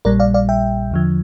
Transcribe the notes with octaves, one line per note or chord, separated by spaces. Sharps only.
A#1 A#2 G3 A#4 D5
D5 F5
D5 F5
E5 G5
E2 D3 F3